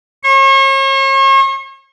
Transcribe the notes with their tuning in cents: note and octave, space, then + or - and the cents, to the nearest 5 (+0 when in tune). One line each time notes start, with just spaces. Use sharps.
C#5 -40 C#6 -40